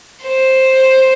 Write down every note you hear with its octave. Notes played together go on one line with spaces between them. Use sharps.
C5